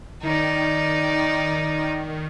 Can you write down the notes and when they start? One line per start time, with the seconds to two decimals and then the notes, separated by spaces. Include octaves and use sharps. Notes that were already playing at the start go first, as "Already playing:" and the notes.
0.23 D#3 D#4 D5